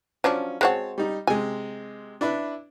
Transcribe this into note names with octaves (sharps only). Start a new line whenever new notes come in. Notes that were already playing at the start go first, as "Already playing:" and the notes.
F3 F#3 C#4 D4
G#3 C4 F#4 C#5 A5
G3 D#4
C3 G#3 G#5
D4 E4 B4